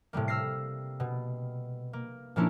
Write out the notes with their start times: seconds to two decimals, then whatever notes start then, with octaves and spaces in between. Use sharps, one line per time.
0.13 A2 C3 G3 A#3
0.28 E6 F6 A#6 C7
1.00 B2
1.93 A#3
2.36 A#2 F3 A#3 C#4 D4 E4